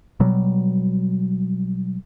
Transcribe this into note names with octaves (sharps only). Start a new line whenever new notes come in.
B2 F#3 G3